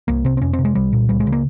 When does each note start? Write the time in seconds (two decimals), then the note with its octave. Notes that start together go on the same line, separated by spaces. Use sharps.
0.08 C2 A#3
0.25 C3 C4
0.37 C4
0.41 F2 C#4
0.53 C4
0.59 C3
0.65 G#3
0.75 C2 G3
0.92 A#2
1.09 C#2 G3
1.20 G#3
1.27 C#3
1.32 A#3